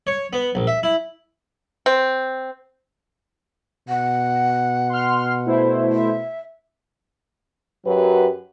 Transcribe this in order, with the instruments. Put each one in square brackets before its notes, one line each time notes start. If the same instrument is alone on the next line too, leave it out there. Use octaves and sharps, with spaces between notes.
[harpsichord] C#5
B3
A#1
E5
E4
[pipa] C4
[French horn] B2 [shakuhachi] F#5
[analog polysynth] C6 F6
A3 E4 C5
[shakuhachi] E5
[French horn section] F#2 F#3 G4 B4